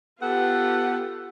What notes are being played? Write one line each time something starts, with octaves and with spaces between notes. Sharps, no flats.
B3 F4 G4 A4 F#5